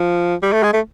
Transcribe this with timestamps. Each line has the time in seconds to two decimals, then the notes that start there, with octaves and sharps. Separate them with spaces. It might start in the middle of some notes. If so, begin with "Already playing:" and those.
Already playing: F3
0.42 G3
0.53 A3
0.63 G#3
0.73 A3